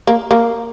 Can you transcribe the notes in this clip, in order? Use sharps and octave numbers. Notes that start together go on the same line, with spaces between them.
A#3
A#3